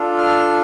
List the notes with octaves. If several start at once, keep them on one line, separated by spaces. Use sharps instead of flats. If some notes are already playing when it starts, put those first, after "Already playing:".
Already playing: D4 F4 A4
F6